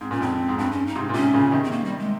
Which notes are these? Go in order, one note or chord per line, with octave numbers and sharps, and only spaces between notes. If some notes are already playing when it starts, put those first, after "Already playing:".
G#2 C4
A#2 C#4
F2 G#2 C4
G#2
G2 C4
C#4
D#4
G#2 C3
A#2
G#2 C3 C#4
A#2 C#3
C3 D#3
C4
A#3
G3
G#3